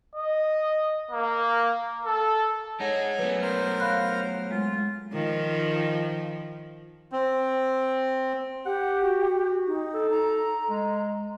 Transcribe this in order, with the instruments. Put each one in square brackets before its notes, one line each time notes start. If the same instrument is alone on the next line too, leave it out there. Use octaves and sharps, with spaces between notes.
[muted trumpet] D#5
A#3
A4
[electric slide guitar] G#3 D#4 [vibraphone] C#5 F#5 [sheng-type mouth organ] G#5 A#5
[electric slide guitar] F#3 A3 B3 [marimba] B4
[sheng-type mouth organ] A#4 C5 F6
[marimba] F5 B5 F#6
[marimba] G#3 [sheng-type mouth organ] F4
[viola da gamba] D#3 F3
[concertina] C4
[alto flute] G4 [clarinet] F#5
[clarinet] F#4
[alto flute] D#4
[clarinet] A4
[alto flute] A#5
[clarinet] G#3